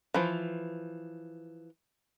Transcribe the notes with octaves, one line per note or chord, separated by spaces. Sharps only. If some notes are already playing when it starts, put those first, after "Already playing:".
E3 F3